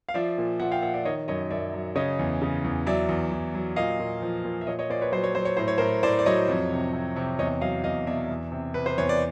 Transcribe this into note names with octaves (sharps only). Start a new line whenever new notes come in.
F5
F3 D5 E5
A#2
A#2 E5 F#5
F5 G5
A#2 E5 F#5
D5 E5
D#3 C#5 D#5
F#2 C#5 D#5
F#2 D5 E5
F#3
C#3 C#5 D#5
E2
C#3
E2
F#3 D5 E5
E2
E2
F#3
A#2 D#5 F5
A#2
F3
A#2
E5
A#2 C#5 D#5
C#5 D#5
A#2 C5 D5
B4 C#5
F#3 C5
C#5
F#3 C5
C#5
A2 C5
C#5
A#4 C5
A2
A2 C5 D5
D5
F#3 C#5 D#5
F2
C3
C3
C3
E2 C#5 D#5
F#3 D#5 F5
E2 D#5 F5
B2 D5 E5
E2
C3
C3 B4
C5
E2 C#5
D5